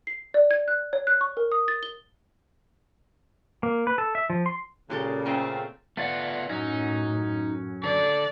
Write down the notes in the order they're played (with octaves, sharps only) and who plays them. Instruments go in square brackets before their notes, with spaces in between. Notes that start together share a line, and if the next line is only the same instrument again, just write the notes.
[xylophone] C7
D5
G#6
F#6
C#5
F#6
C#6
A#4
D#6
A6
G7
[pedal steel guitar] A#3
B4
A4
E5
F3
C6
[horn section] A#2 C#3 [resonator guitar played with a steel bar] G#3 G4 A4
[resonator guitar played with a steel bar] A3 A#3 C#4 [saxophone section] C4 F4
[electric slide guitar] A3 D5 F#5 [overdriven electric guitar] B3 F4
[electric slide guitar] F#2 F#3 C#4 [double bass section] A2 [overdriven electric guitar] D#4
[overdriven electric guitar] D3 A4 [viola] D5